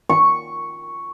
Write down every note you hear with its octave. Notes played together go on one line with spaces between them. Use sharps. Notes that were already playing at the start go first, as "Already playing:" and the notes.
C#6